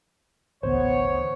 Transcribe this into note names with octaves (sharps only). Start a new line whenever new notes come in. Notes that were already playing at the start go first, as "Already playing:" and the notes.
A1 D2 B3 C5 C#5